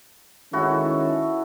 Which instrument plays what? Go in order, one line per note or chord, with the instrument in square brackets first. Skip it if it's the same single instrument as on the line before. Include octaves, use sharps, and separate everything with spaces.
[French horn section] D#3 G#3 C#4 [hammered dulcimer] E4 F#4 A4